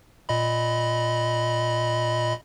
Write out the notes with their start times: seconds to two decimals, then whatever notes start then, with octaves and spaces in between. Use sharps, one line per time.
0.29 A#2 D#5 B5